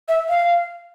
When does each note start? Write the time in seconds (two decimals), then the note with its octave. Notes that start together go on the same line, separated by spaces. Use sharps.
0.08 E5
0.29 F5